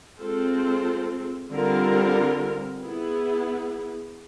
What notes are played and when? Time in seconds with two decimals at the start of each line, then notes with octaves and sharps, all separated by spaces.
0.21 G#3 C4 F4 A4 C5
1.52 D3 G3 C4 F4 A#4
2.83 B3 E4 G#4